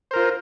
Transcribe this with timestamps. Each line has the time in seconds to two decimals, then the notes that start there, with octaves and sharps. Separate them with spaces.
0.11 C5
0.13 A#4
0.16 F4